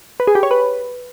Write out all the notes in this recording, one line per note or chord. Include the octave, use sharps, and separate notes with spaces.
B4
G#4
G4
C#5
B4